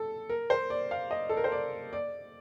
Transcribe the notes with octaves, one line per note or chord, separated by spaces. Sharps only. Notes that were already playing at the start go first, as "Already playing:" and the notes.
Already playing: A4
A#4
C5
D5
F5
D#5
A4
A#4
C5
D5
D5